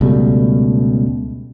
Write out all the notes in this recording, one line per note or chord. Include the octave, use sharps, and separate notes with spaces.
C#2 B2 G3 A3